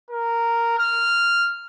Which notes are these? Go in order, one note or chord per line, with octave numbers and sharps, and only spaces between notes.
A#4
F6